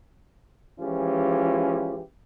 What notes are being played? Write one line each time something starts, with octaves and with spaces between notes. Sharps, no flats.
E3 F3 G#3 C#4 F4 G4